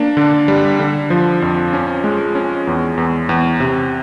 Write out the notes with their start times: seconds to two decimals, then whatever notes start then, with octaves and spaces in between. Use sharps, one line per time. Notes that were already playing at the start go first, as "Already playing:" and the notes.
Already playing: A#3 D4
0.17 D3
0.48 G3
0.80 D3
1.10 F3
1.42 F2
1.73 C#4
2.04 G#3
2.35 C#4
2.67 E2
2.97 E2
3.29 E2
3.60 C3